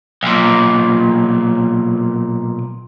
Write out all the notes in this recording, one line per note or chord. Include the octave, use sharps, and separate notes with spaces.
B1 A#2